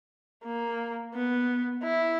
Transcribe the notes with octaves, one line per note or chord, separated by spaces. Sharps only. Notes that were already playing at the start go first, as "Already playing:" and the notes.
A#3
B3
E4